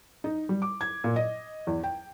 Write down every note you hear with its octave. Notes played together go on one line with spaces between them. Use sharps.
D#4
G3
D6
G#6
A#2
D#5
E2
G5